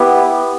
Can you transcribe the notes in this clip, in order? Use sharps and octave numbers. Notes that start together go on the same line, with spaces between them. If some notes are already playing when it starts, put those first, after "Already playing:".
Already playing: B3 E4 G4